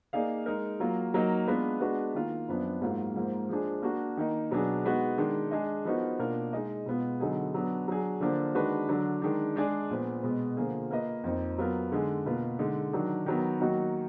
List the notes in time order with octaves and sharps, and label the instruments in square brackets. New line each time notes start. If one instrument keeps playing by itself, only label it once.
[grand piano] A#3 D#4 G#4 D5 F5
G#3 D#4 A#4
F#3 A#3 F4
F#3 A#3 D#4 A#4
G#3 B3 D4 F4 B4
G#3 B3 D4 F#4 B4
D#3 A#3 F4
F#2 F3 B3 D4
G#2 F#3 A#3 F4
G#2 F3 A#3
F3 G#3 D4 G#4
A#3 D4 F#4
D#3 A#3 D#4
B2 F#3 B3 D4 G#4
G#3 B3 D#4 F#4
D#3 G#3 D4
G#3 D4 G#4 D#5
F3 B3 D#4 F#4 A#4
B2 A#3 D4 F4 A#4
G#3 D#4 G#4 D#5
B2 G#3 B3 F4
D3 F#3 B3 D#4 G#4
F#3 B3 D4
F#3 D4 G#4
D3 F3 A#3 D4
D#3 G#3 D4 F#4 B4
D3 F#3 D4
D#3 G#3 D4
G#3 D4 G#4 D5
A#2 F3 B3
B2 G#3 B3
D3 F3 A#3 F4 G#4
A#3 F4 B4 D#5
F2 F3 A#3 D#4
F#3 B3 F4 A#4
D3 G#3 D#4 G#4
B2 A#3 F4 B4
D3 G#3 D#4
D#3 F#3 D4
D#3 F#3 B3
D#3 F#3 A#3 D#4 F#4